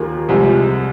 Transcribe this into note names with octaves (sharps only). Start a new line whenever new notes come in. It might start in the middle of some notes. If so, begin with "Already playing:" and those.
Already playing: D#2 D#3 A#3 F4 G#4
C2 C3 F3 G#3